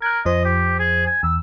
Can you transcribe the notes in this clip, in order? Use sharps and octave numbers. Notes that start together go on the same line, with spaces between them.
A#4 F#6 G#6
F2 F3 C5 D#5
G4
G#4
G#5
E2 E6